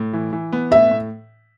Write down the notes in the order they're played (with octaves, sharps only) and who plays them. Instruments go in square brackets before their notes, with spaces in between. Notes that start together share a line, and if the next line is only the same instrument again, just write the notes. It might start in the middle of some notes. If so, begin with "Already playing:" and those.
Already playing: [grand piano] A2
E3
E3
B3
[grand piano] A2 [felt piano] E5
[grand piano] A2